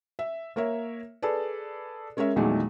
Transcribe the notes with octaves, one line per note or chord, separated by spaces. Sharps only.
E5
A#3 A#4 C#5 E5
G#4 A4 B4 D5
G#3 C#4 A#4 C#5 E5
E2 A#2 D#3 F#3 G#3 A3